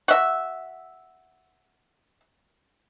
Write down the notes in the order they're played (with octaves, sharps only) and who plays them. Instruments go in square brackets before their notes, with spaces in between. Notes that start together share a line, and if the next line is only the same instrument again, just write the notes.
[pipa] F#4 E5